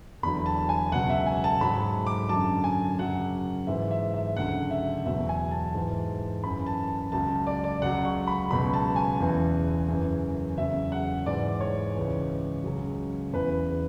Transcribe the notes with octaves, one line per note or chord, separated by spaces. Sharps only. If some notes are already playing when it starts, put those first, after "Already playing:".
E2 D3 F#3 B5
A5
G#5
C#2 B2 F#3 F#5
E5
G#5
A5
G#2 F#3 B5
D6
F#2 D3 F#3 A5
G#5
F#2 C#3 F#3 F#5
G#2 E3 E5
E5
E5
D2 C#3 F#3 F#5
E5
E2 B2 F#3 E5
G#5
A5
G#2 E3
F#2 E3 B5
A5
C#2 C#3 F#3 A5
D5
D5
C#2 C#3 F#3 F#5
C#6
B5
C#2 B2 F#3 B5
A5
G#5
E2 C#3 E3
F#2 C#3 E3
E2 C#3 F#3 E5
F#5
G#2 E3 D5
C#5
C#2 C#3 E3
C#2 C#3 F#3
E2 C#3 E3 B4